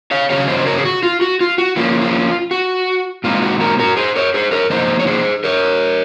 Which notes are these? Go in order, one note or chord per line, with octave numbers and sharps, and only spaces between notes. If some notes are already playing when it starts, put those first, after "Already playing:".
C#5 F5
C#3 F#3 C#4 C#5 F5
C5 D#5
C5
A#4 C#5
G#4
F#4
F4
F#4
F4
F#4
F3 A#3 C#4 F4
F4
F#4
A#2 G#3 C4 D#4 F4
F#4
F#4 A#4
F#4 A#4
G#4 C5
A#4 C#5
G#4 C5
A#4 C#5
F3 A#3 D#4 C5 D#5
C#5
G#4 C5
A#4 C#5